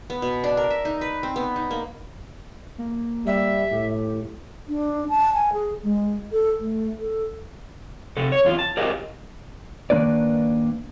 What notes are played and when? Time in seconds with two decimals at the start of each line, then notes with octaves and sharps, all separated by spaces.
0.10 B3
0.22 B2
0.44 D4
0.57 A#4
0.70 E5
0.85 D#4
1.01 B4
1.23 C4
1.36 B3
1.56 D#4
1.71 A#3
2.78 A#3
3.26 G3 E5
3.72 A2 G4
4.69 D4
5.09 A5
5.34 G#5
5.53 G#4
5.83 G#3
6.32 A4
6.60 A3
6.99 A4
8.17 C3 A4
8.32 C#5
8.45 E2 F4
8.59 A5
8.77 G4 G#4 A#4 C5 D#5 F5
9.90 D#3 A#3 D4 B4 D5